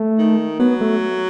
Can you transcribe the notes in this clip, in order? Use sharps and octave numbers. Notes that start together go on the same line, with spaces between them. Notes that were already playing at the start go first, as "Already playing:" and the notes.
Already playing: A3
D#3
F#3 B3
A3